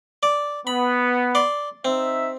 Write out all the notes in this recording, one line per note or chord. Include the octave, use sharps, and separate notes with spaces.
D5
B3 B5
D5 C6
C4 D#4 E5